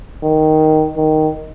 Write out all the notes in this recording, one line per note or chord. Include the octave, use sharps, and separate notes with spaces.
D#3
D#3